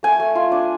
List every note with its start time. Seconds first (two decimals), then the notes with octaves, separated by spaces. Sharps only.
0.03 A3 G#5
0.20 A3
0.35 F4
0.52 D4